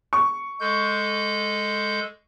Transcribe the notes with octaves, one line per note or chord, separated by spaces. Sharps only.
C#6
G#3 A4 G6